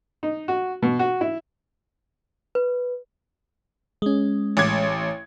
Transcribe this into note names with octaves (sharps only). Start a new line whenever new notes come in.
D#4
F#4
B2
F#4
E4
B4
G#3 C#4
A1 D6 G#6